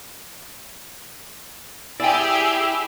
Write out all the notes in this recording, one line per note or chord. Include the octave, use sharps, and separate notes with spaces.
E4 G4 G#4 D5 G5